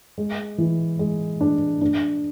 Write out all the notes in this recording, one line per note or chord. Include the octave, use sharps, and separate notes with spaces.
G#3
E3
G#3
D4
D4